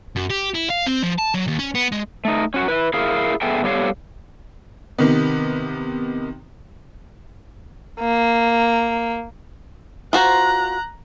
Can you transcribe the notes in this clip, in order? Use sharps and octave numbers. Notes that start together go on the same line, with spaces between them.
F#2
G4
E4
F5
C4
F3
A5
F#3
D#2
C#4
B3
G#3
A3 D#4
C#4 F#4
E4 B4
E4 G#4 A#4 F5
B3 G#4 A4 E5 G5
G3 B3 G4 A4 C#5 F5
C3 D#3 B3
A#3
F4 F#4 C5 A#5 F#6